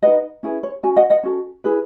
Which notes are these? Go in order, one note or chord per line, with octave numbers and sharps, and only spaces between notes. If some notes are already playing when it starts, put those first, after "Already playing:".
D#4 G#4 B4 D#5 F#5
C#4 E4 G#4 B4
C#5
C#4 F#4 G#5
D#5 F#5
D#5 F#5
C#4 F#4 A4
E4 G#4 B4